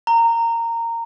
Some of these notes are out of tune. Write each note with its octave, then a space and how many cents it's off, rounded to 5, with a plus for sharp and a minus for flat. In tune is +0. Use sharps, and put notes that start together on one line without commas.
A#5 -15